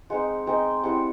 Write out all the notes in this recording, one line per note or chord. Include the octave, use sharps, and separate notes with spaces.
G#3 C4 D#4 F#5
G#3 C4 D#4 G5
G3 C4 E4 F#5